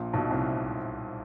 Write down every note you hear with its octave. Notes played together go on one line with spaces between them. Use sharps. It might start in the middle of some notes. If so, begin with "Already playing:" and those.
Already playing: A#1 A#2
B1 B2
C2 C3